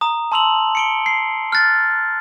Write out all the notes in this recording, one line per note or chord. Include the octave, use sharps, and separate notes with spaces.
A#5 D#6
A5 C6 E6 F7 F#7
C#7 D7 G7
C7
F6 F#6 A6